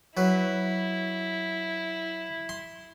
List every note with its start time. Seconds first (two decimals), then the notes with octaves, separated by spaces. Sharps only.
0.17 F#3 E4 B4
2.49 C6